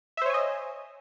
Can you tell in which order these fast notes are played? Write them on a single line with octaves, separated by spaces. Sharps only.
E5 C5 C#5 G#5 D#5